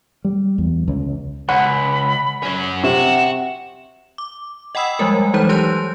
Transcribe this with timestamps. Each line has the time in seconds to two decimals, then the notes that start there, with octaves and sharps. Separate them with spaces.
0.25 G3
0.58 E2
0.88 C#2
1.49 C#2 F#5 B5
2.43 F#3 C#4
2.84 C3 F#4 E7
4.18 D6
4.75 D#5 F#5 G5 B5 D#6 E6
4.99 F3 G3 G#3 A#4
5.34 E3 F#3 G#3 D#4 C5 G6
5.49 G4 B4 C6 F#6 G6